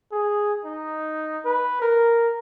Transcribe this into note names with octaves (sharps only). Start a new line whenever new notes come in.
G#4
D#4
B4
A#4